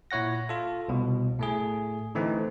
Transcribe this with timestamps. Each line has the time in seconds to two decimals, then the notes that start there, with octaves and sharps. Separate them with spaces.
0.11 A#2 E4 C#5 F#5 A#6
0.49 F4 A4
0.88 C2 B2
1.39 A2 A3 G#4
2.15 D3 E3 A3 C4 D#4